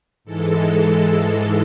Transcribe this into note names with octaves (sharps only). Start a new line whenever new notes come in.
G#2 E3 G#3 A4